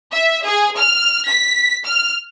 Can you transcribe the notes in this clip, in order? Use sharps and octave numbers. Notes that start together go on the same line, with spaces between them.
E5
G#4
F6
B6
F6